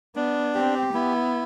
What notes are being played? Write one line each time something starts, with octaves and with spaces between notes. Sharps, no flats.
B3 D4
C4 G4
B3 E4